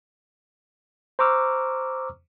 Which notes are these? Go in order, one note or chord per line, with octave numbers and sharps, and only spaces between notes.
C5 A#5 C#6 D6 E6 F6